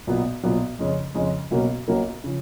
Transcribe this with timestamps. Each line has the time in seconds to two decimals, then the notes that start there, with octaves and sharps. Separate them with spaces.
0.07 B1 A#2 F#3 B3
0.43 B1 A#2 F#3 B3
0.79 F2 C#3 G#3 C#4
1.15 F2 C#3 G#3 C#4
1.51 B1 B2 F#3 A#3 C#4
1.88 B1 B2 F#3 A#3 C#4
2.24 C#3 F3